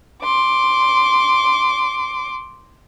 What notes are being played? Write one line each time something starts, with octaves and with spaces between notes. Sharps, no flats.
C6 D6